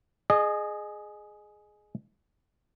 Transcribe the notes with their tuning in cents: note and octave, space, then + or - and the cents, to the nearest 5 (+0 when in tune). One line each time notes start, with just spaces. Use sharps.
G#4 +10 D#5 -25